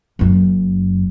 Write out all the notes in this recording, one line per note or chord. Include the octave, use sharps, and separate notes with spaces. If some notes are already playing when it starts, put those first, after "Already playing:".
F#1 F#2